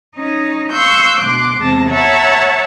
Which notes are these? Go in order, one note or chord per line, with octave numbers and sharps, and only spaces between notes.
C#4 D#4 D#5
F5 C6 C#6 E6 F#6 G6
D2 B2 C6 D6 F#6
E2 C3 G#3 C4 A5 A#6
C#5 E5 F#5 A5 A#5